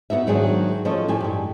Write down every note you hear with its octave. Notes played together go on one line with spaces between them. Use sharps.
B3 D#4 F#4 E5
G#2 D#3 F#3 G#3 D4 G#4
F3 A3 C#4 D#4 C#5 D#5
A2 E3 G4 G#5
G2 G3